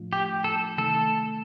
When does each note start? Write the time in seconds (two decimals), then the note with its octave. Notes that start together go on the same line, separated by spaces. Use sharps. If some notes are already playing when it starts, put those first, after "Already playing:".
Already playing: A2 F3 A3 D4 F4
0.13 G4
0.44 A4
0.77 C3 D#3 A3 A4